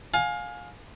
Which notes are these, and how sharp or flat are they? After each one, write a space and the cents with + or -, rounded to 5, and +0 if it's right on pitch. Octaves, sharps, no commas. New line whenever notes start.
F5 +25 G#5 +10